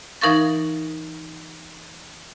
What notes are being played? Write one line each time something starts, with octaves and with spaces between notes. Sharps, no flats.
E3 D#4 A#4 F5 C#6 A6